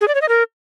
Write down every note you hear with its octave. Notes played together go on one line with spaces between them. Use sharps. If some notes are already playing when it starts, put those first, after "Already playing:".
G#4
D5
C#5
D#5
A#4